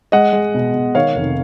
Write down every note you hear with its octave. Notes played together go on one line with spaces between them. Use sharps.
G#3 D#5 F#5
G#3
B2
B2
D#3 C#5 F5
F1